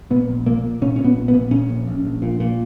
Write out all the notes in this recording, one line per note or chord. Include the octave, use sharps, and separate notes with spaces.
A#2 B3
A#1
A#2 A#3
A#2
A#2 C#4
A#2 C#4
B3
A#1
B3
A#2
A#2 C#4
A#1
A#1
A#1
A#2
A#2